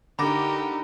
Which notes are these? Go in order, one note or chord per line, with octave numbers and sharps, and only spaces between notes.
D3 D#4 G4 A#4 A#5 B5 D6 A#6